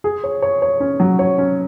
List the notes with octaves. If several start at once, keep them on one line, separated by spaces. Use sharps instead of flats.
G#4
C#5
C#5
C#5
C#4
F#3
C#5
C#4